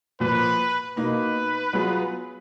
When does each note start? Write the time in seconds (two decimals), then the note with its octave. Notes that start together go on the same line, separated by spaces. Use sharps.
0.20 A#2 F3 A#3 B4
0.96 B2 A#3 D#4 B4
1.73 F#3 B3 F4 G#4